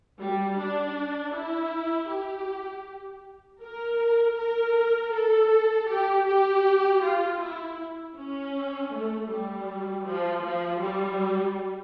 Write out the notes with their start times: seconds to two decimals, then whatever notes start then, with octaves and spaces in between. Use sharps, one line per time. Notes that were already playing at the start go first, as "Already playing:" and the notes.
0.19 G3
0.58 D4
1.34 E4
2.09 G4
3.62 A#4
4.36 A#4
5.12 A4
5.88 G4
6.26 G4
7.03 F4
7.40 E4
8.15 C#4
8.92 A3
9.29 G3
10.06 F3
10.44 F3
10.81 G3